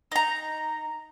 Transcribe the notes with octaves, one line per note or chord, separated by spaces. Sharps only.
D#4 A#5